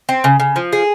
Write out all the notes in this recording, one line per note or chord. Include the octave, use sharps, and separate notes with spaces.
C4
C#3
C#3
F3
G#4